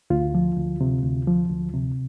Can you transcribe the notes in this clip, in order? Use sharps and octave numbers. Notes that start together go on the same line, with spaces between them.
D2 F4
F3
D2
C3
D2
F3
D2
C3